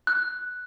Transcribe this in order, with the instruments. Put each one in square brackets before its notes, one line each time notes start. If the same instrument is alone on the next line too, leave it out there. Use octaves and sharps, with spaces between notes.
[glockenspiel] F#6